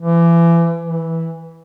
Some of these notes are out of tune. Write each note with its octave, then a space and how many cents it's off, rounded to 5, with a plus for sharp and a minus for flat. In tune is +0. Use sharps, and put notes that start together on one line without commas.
E3 +30
E3 -10